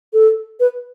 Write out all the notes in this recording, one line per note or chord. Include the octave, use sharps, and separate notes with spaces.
A4
B4